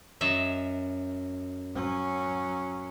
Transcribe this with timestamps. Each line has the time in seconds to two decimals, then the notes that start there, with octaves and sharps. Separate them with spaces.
0.21 F#2 D#5 E5
1.75 F#3 C#4